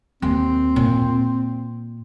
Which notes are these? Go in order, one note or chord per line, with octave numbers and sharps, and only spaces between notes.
D#2 C4
A#2